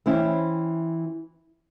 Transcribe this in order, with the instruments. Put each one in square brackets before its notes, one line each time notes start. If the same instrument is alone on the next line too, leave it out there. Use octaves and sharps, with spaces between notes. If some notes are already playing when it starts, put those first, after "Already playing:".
[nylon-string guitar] E3 C4 C#4 E4